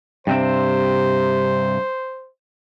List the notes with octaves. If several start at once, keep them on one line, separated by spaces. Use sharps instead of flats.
G2 C3 C4 C5